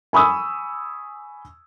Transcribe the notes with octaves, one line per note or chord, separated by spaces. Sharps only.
G#5 B5 C#6 D#6 E6